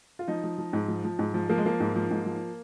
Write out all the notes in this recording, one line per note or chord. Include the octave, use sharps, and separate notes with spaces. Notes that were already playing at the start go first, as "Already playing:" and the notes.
F4
F3 D#4
F3
F3
G#2
F3
F3
G#2
F3
F3 A#3
G#3
F3 A#3
G#2
F3
G#2
F3